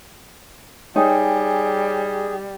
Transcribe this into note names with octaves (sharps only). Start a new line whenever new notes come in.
G3 D#4 G#4 C#5 G5 G#5